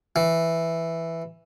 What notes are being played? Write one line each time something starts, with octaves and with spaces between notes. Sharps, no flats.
E3